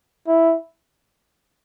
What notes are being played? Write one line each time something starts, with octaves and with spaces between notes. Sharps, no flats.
E4